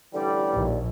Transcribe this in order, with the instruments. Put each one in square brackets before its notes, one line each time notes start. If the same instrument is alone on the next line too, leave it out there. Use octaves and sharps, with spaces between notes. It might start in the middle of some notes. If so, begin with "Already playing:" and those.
[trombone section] A1 E3 G3 [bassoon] D3 [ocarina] D5
[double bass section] A#1 [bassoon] D#2